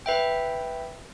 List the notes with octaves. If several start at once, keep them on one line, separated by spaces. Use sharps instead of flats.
B4 E5 G5